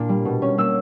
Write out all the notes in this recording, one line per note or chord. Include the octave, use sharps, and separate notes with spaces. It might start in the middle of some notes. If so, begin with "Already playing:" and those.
Already playing: A#2 A#3 D4
G3
B2
C#4
A#3 E6